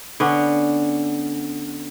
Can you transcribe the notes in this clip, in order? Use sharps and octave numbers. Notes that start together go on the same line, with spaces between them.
D3 B3 C#4